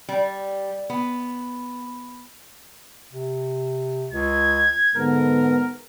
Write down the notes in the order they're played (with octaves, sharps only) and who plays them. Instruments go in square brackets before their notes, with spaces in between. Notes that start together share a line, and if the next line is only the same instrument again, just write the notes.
[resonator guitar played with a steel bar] G3
B3
[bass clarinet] C3
[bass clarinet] C#2 [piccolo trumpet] G#6
[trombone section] G#2 B3 [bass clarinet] D3 [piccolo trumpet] A#4